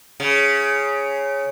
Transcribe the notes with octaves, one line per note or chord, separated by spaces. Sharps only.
C#3